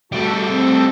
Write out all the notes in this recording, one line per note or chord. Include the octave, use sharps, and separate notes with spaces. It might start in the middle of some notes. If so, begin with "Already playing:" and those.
G3 A3 F#4 A4
C4 A4